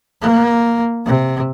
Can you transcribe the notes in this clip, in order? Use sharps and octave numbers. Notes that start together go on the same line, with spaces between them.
A#3
C3